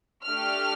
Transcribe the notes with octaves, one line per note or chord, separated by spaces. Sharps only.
A3 D4 G4 F6